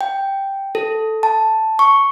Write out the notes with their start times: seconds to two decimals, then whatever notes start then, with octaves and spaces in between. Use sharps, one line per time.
0.01 G5
0.75 A4
1.23 A5
1.79 C#6